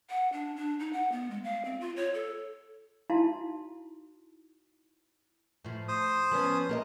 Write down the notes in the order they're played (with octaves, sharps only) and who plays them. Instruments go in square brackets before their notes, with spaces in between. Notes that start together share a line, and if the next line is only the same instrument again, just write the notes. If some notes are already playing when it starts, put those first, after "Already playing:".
[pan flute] F#5
D4
D4
D#4
F#5
B3
G#3
F5
C4
F4
C#5
A4
[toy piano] D#4 E4 F#4 F5 A5 C6
[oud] A2 F3
[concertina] C5 D#6
[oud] F3 B3 C#4
A#3 G#4 D#5